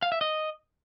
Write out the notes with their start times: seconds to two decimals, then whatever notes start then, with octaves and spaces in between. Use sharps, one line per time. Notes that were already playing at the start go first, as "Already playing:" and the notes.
0.02 F5
0.12 E5
0.21 D#5